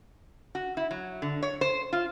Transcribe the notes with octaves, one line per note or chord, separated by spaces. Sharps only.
F#4
E4
F#3
D3
C#5
C5
F4